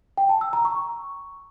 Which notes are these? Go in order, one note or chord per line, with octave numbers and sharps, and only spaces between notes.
G5
A5
E6
A#5
C#6